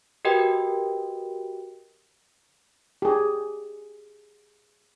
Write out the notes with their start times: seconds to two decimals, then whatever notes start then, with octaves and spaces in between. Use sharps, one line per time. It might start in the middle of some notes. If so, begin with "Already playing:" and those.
0.25 F#4 G4 A#4 B4 D#5 G5
3.02 G4 G#4